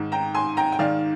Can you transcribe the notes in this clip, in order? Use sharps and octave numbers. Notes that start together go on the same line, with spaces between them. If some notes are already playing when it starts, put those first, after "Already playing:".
Already playing: G#2 D#3
G5 A#5
G#5 C6
G5 A#5
G5
G#2 D#3 D5 F5